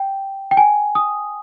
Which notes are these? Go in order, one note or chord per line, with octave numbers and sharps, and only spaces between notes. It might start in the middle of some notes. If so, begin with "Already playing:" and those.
Already playing: G5
G5
G#5
D#6